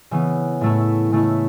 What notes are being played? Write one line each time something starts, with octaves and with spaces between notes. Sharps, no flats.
C#3 E3 B3
A2 A3 E4
C#3 A3 E4